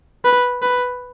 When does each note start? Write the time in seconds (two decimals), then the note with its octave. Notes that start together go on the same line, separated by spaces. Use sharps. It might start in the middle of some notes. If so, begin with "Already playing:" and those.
0.25 B4
0.62 B4